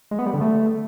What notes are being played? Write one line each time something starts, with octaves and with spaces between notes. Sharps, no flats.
G#3
B3
G3
D3
A3